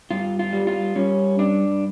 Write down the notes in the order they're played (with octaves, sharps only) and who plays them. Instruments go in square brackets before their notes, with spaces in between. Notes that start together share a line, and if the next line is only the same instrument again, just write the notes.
[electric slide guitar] G2 F4
F4
G3
F4
G3 C#4
G2 D4